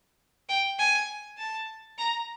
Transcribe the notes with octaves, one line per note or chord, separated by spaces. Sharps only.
G5
G#5
A5
A#5